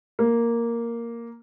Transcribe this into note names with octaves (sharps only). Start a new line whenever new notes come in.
A#3